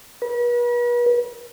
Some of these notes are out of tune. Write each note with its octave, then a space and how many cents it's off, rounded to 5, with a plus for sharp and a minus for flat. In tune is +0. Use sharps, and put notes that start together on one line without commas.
B4 -40